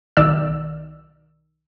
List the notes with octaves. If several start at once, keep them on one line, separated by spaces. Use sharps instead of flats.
B1 D#3 D5 E6